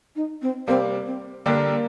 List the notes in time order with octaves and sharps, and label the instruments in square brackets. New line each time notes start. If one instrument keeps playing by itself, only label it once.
[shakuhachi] D#4
C4
[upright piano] C3 G3 A#3 [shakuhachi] C4
[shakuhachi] C4
[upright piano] D3 G3 D4 G4 A#4 [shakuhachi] A#3
[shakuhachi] A#3